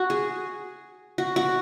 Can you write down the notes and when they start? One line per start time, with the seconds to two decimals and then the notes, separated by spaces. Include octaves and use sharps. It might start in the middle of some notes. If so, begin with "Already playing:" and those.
Already playing: F#4
0.10 G#4
1.18 F#4
1.36 F#4